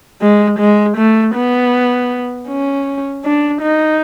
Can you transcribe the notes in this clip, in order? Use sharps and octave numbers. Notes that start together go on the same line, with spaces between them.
G#3
G#3
A3
B3
C#4
D4
D#4